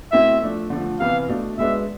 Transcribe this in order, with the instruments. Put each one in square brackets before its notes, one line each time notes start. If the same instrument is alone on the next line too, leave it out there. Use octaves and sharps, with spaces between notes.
[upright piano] B2 A3 C4 E4 [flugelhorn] E5
[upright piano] F3 A3 D4
D3 F3 A3
[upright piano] C3 E3 B3 [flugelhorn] F5
[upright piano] B2 A3 D4
[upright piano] B2 G#3 B3 D4 [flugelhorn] E5